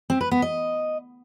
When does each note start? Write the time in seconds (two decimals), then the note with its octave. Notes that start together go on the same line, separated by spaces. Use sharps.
0.10 C4
0.21 B4
0.31 B3
0.42 D#5